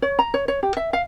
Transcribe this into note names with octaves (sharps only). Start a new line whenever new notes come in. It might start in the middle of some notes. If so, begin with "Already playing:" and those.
C#5
A#5
C#5
C#5
G4
E5
F5